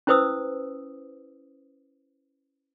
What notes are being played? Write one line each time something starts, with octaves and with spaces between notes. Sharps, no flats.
C#4 E4 B4 C5 D#6 E6